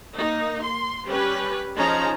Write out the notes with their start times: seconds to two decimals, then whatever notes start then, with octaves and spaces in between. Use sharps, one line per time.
0.15 A#3 D#4
0.64 C6
1.07 G3 C#4 G4 B4
1.77 F3 C#4 D#4 G#4 A5 A#5